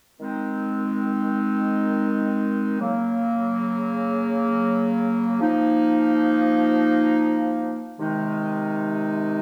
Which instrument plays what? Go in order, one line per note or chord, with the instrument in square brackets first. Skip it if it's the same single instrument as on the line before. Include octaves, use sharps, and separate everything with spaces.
[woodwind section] D#3 G#3 C4 D#4
C#3 F#3 A#3
F3 A#3 D#4
C3 D#3 G#3 D#4